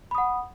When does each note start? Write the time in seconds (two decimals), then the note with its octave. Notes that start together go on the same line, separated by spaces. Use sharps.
0.11 B5
0.15 D#6
0.18 F#5